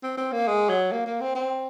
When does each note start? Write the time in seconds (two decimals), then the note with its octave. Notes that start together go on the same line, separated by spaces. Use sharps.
0.03 C4
0.17 C4
0.32 A#3
0.47 G#3
0.69 F#3
0.92 A#3
1.06 A#3
1.21 C4
1.35 C4